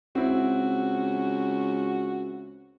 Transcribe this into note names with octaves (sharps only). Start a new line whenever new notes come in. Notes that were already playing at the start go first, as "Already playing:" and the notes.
C#2 C4 E4 F#4